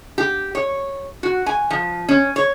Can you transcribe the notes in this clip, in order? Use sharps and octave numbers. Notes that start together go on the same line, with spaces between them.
G4
C#5
F#4
G#5
F3
C#4
C#5